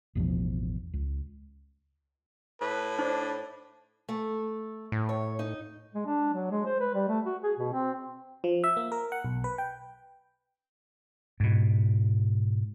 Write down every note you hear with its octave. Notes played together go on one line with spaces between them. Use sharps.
A1 E2 B2 F3
C#2
A2 B4
D4 D#4 C5
A3
A2
C#5
D#4
G#3
D4
F#3
G#3
C5
B4
G3
A3
F#4
G#4
B2
C4
F3
E5
A#3
A#4
F#5
B1
B4
G5
G#2 B2